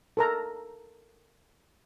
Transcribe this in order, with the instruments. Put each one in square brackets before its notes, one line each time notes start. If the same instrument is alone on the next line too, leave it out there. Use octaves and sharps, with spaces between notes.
[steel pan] A4 A#4 A#5